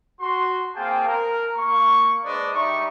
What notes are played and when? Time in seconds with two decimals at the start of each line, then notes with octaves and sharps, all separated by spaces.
0.20 F#4 C6
0.74 A#3 C4 G#4 F5 G5 A5
1.06 A#4
1.56 A#3 C#6
2.23 G#3 D4 B4 C5 D5 D#5
2.53 G3 D#4 G4 E5 C#6